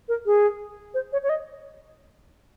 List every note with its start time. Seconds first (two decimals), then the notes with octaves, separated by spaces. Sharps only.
0.08 A#4
0.26 G#4
0.94 C5
1.13 C#5
1.23 C#5
1.29 D#5